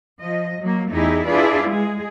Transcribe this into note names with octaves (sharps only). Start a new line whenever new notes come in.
F3 D#5
F#3 A#3
E2 A3 D#4 E4 G4 G#4
D4 E4 F4 G#4 B4 D5
G#3 G#4